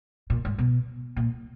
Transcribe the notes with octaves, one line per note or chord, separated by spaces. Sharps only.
A#2
G#2
B2
A#2